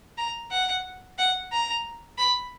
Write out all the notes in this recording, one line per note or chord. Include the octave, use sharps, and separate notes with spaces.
A#5
F#5
F#5
A#5
B5